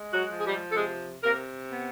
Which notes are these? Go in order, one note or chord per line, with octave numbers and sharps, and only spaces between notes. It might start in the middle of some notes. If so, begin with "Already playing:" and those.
Already playing: G#3
F#3 F#4
F3
G#4
G3 G4
A4
C3 G#3 G#4
C3 A#3 A#4
B3